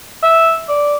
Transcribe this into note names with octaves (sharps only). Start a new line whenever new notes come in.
E5
D5